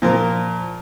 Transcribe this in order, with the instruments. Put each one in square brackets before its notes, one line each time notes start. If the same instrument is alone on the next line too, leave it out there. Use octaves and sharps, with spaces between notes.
[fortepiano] A#2 F3 A#4